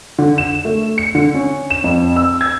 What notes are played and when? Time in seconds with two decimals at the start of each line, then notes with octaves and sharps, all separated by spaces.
0.18 D3
0.38 E7
0.65 A3
0.98 C#7
1.15 D3
1.34 C#4
1.70 E7
1.84 F2
2.16 E6
2.41 G#6